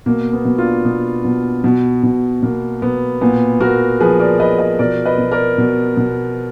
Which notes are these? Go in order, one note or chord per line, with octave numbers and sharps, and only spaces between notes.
B2 A#3
B3
B2
D4 F4
B2 B3
B2
B2
B2
B2 A#3
B2 B3
A#2 B3
A#2 F#4 A#4
F3 G#4 B4
A#4 D5
F3 B4 D#5
B4 D#5
B2 A#4 D5
B4 D#5
B2
A#4 D5
B2
B2